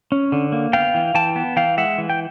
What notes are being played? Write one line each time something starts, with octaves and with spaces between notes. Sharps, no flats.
C#4
D3
A#3
B3 F5 G5
E3
E3 G5 A5
B3
E3 F5 G5
G#3 E5 F#5
E3
G5